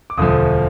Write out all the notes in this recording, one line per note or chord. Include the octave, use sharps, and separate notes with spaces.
D6
E1 D2 D3 F3 D#6